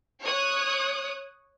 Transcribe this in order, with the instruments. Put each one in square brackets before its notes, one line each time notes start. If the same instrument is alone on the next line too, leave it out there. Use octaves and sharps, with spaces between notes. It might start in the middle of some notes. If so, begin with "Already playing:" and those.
[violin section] C#5 D#6 F#6